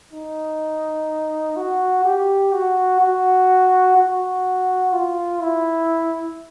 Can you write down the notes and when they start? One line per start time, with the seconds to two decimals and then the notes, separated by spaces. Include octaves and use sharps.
0.12 D#4
1.56 F#4
2.05 G4
2.53 F#4
3.00 F#4
3.97 F#4
4.93 F4
5.41 E4